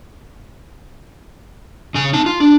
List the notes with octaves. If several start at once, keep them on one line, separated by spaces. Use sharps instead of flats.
C#3 G#5
D#4 A5
F4
D4